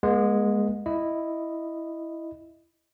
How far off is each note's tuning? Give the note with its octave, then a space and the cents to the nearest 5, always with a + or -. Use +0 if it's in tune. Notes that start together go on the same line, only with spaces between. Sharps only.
G#3 +0 B3 -45
E4 +0 D#5 -10